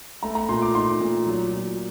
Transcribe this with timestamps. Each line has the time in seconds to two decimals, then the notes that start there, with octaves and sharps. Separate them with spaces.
0.23 A3 A#5
0.35 A#5
0.49 A#2 C6
0.62 D6
0.75 D#4 C6
1.00 A#2
1.26 F#3
1.52 A#2